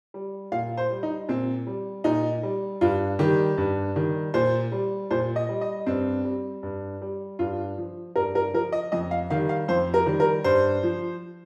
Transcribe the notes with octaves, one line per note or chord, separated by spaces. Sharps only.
G3
A#2 F5
C5
G3
D#4
A#2 C4
G3
A#2 D#4
G3
G2 F4
D#3 G3 G4
G2
D#3 G3
A#2 C5
G3
A#2 C5
D#5
G3
D#5
G2 C4
G3
G2
G3
G2 F4
F3
G2 A#4
A#4
F3 A#4
D#5
F2 D#5
F5
D#3 G3 F5
F5
F2 C5
A#4
D#3 G3
A#4
G2 C5
F3